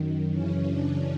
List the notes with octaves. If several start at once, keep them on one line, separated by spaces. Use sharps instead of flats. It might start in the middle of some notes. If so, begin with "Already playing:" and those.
Already playing: F#2 D#3
F#2 C#3 E3 C#4
D4